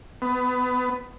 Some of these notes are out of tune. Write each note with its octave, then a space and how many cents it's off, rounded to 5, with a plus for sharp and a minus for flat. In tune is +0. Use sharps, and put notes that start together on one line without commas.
B3 +20